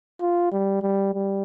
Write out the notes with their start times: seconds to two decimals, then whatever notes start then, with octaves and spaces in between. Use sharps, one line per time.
0.21 F4
0.52 G3
0.82 G3
1.14 G3